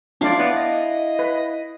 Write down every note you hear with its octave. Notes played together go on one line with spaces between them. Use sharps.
D4 E4 F4 D5 F5
B3 D5
D#5
B4